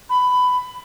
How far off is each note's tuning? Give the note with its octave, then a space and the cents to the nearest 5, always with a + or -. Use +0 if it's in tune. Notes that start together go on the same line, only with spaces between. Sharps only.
B5 +15